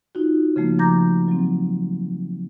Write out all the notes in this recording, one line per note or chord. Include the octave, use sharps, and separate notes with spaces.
D#4 F4 F#4
C#3 F3 A3 A#3
F3 A#5 D6 G6 A#6
F#3 C4